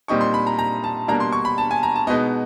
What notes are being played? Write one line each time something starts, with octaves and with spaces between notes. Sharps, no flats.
A#2 G3 C4 D#4 C#6
C6
B5
A#5
A#5
A5
B2 G3 A#3 D4 A#5
C6
C#6
B5
A5
G#5
A#5
A5
B2 G#3 B3 D#4 D#5